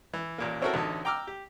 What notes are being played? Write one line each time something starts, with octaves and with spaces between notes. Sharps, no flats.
E3
A1 A#2 A#3
C4 C#4 E4 F#4 A4 A#4
A1 D2 D#4 A4
G5 A#5 D6 E6 F6
G4